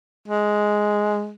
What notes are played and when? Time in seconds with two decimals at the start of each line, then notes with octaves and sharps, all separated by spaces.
0.28 G#3